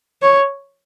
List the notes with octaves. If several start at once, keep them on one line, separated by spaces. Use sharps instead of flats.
C#5